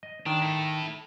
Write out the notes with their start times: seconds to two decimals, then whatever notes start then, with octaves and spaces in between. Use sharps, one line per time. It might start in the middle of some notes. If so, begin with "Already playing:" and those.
0.03 D#5
0.26 D#3 D4
0.42 E4 A4